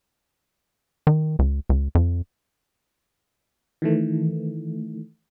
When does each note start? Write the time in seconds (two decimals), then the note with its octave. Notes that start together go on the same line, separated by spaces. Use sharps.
1.07 D#3
1.39 C#2
1.69 C#2
1.95 F2
3.82 D#3 E3 A3